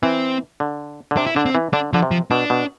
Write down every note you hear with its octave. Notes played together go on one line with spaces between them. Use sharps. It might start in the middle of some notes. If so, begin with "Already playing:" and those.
E3 C4
D3
D3
C3 D4
E4
D3 D4
C4
E3
D3 D4
D3 F3
C3
F3
B2 D4
B2